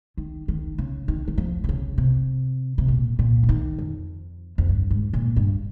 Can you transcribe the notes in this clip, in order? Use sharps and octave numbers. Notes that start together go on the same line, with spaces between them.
D#3
D#3
C#3
D#3
D#3
F3
C3
C#3
C3
C3
A#2
A#2
C#3
D#3
F2
F2
G2
G#2
A#2
G2